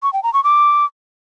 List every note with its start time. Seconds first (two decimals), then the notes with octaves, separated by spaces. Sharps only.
0.03 C#6
0.13 G5
0.23 A#5
0.34 C#6
0.44 D6